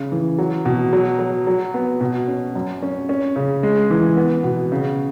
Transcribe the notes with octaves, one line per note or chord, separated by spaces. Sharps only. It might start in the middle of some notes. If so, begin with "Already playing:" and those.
Already playing: C#3
E3
F#3
B2
F#3
F#3
F#3
B3
B2
C#4
F#2
C#4
C#4
C#3
G#3
E3
B3
B2
C#3